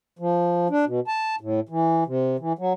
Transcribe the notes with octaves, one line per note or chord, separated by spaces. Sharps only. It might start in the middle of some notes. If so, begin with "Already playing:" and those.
F3
D4
B2
A5
A2
E3
C3
E3
F#3